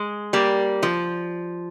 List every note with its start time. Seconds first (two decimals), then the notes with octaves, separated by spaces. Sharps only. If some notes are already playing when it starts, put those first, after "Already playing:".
Already playing: G#3
0.33 G3 A#3
0.83 F3